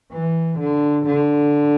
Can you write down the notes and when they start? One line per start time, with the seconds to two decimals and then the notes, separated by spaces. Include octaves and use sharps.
0.12 E3
0.59 D3
1.06 D3